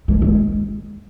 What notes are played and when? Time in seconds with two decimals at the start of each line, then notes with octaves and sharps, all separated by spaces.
0.08 G#3
0.22 G#3